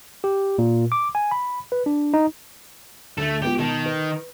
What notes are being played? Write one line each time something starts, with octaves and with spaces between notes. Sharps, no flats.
G4
A#2
D6
G#5
B5
B4
D4
D#4
D2 A3 A4
G#3 B3 F4 G4
B2 D#3 A5
B4